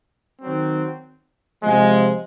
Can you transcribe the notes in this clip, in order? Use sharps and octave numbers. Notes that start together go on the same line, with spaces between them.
D#3 F#3 C4
C3 F3 G#3